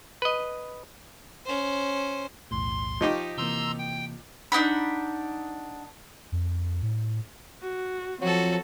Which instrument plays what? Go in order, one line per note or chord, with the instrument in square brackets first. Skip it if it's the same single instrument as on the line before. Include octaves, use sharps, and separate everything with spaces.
[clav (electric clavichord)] B4 D#5
[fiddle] C#4 C5
[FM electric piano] B1 E2 A2 [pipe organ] C6
[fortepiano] F3 D#4 G4 [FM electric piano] D#5 C#6 D6
[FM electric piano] C3 E3 A#3 [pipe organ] A#5 C6 E6
[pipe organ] G5
[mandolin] D4 D#4 F#5 B5
[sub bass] F2
A2
[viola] F#4
[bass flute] F3 [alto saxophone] F#3 [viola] C4 [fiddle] F#4 A4